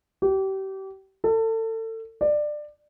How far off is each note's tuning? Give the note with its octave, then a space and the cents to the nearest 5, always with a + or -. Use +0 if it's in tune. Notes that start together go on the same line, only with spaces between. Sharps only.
G4 -30
A4 +30
D5 +20